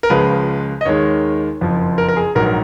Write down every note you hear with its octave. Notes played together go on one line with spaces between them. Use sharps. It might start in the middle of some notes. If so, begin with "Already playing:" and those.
A#4
C#2 C#3 F3 G#3 B4
D#5
D#2 D#3 G#3 C#5
F#1 F2 F3
A#4
A#4
G#4
A#1 G#2 F#3 A#4
A#4